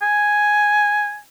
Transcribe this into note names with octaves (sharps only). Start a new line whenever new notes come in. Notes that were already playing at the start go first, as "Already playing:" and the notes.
G#5